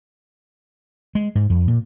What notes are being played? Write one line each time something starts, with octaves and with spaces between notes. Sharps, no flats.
G#3
G#2
F2
A#2